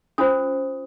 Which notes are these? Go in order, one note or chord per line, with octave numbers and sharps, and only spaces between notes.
C#4 F4 C5 D#6